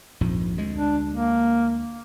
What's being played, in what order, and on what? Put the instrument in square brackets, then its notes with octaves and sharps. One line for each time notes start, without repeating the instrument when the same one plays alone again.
[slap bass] A#1 F2 G#2
D2 G#3
[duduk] D4
A#3